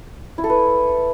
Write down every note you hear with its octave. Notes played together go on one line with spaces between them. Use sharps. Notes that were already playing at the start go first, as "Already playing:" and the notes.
E4
A4
B4